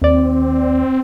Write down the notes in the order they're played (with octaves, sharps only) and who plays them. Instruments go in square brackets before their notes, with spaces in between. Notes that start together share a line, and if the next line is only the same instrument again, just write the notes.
[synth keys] D#2 D5 [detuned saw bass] C4